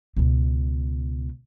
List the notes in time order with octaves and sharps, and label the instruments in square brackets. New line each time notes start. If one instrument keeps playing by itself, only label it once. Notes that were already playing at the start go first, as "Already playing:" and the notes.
[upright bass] C#2 B2